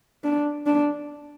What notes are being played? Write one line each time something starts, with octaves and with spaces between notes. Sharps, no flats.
D4
D4